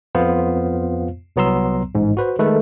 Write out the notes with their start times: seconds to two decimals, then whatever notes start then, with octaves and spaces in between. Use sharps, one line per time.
0.15 F2 B3 F4 C5 F5
1.36 C2 F#3 B3 A#5 C6 E6
1.95 A1 G#2
2.17 F#4 B4 C5
2.39 D#3 G#3 A3 A4 B4